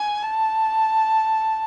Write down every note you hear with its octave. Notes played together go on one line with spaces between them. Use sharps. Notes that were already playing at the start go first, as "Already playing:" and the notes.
Already playing: G#5
A5